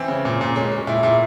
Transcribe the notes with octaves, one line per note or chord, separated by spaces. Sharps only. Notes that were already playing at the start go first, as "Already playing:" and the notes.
Already playing: E3 C4
C#3
A#2
A#2
G#3 C#4
G#3
A#2 E4
A#2 E4